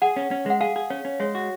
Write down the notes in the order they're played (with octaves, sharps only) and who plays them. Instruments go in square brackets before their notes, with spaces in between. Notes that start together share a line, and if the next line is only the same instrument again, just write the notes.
[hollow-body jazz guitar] G#4 [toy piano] F#5
[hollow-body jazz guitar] C#4
C#4
[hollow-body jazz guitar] G#3 [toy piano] F#5
[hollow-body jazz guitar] G#4 [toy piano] F5
[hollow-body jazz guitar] G#4
[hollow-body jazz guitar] C#4 [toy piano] C#5
[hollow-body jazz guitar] C#4
[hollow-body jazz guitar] G#3 [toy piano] C#5
[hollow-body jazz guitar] F#4